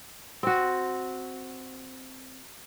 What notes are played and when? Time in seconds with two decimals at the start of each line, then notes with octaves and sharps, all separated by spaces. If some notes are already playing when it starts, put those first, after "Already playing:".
0.43 C4 F#4